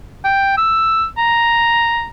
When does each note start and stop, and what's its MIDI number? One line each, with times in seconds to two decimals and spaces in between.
0.24 0.54 79
0.58 1.06 88
1.18 2.08 82